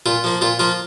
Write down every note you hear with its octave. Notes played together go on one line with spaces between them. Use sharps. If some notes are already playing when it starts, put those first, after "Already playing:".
A#2 F4
F3 A#3
A#2 F4
F3 A#3 F4